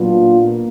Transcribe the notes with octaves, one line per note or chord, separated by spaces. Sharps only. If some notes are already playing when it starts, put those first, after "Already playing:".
Already playing: A#2 F#3 B3 D4 F4
A#3